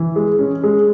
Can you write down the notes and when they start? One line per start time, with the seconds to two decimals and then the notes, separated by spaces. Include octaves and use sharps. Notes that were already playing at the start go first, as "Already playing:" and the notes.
Already playing: E3
0.16 G#3
0.39 C#4
0.64 G#3